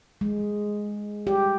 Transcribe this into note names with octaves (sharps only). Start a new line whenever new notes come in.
G#3
G4